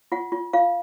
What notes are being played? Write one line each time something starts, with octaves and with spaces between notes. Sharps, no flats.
F4 F#5
F4
F4 F5